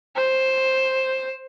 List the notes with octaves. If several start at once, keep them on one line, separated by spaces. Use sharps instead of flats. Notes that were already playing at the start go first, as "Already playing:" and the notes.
C5